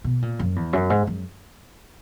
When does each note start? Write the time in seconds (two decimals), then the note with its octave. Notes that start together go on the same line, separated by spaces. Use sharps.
0.04 B2
0.22 A#2
0.39 F#2
0.56 E2
0.73 F#2
0.90 G#2
1.07 F#2